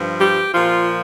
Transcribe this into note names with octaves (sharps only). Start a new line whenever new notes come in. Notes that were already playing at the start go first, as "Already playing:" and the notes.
Already playing: G2 F3
G4
A#2 F3 F4